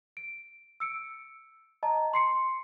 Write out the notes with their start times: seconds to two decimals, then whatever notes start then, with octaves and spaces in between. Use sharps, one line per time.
0.17 D7
0.80 E6 C#7 D7
1.83 D#5 A5 A#5
2.14 C6 C7 C#7